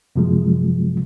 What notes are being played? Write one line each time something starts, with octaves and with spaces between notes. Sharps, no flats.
F#2 C3 F3 F#3 G#3